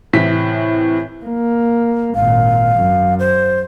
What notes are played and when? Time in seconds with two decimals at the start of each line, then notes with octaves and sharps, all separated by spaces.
0.13 A2 C3 E3 B6
1.25 A#3
2.15 G#1 A#2 F5
2.76 F#2
3.19 C5